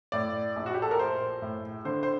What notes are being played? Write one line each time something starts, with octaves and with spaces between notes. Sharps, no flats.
A2 D5
A#1
F#4
G4
A4
A#4
A#1 C5
A2
D3 C5
C5